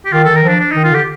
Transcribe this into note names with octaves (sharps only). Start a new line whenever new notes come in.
G4
D#3 F4
D#3 A4
A#4
F3 D4
D4
D#3 D#4
F4
D3 G4